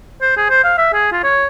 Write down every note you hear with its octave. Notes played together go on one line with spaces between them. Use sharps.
C5
G#4
C5
F5
E5
G#4
F4
C#5